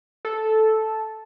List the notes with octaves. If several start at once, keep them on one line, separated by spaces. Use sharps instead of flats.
A4